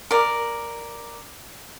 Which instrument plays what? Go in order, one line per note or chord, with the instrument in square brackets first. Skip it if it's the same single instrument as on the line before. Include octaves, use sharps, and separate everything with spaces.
[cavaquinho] A#4 D5